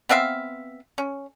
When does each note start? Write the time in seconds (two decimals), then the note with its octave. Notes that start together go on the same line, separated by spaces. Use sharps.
0.09 B3 C4 E5 F5
0.98 C#4